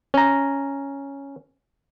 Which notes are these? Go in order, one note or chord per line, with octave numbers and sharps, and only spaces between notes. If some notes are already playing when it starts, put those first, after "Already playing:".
C#4 A#5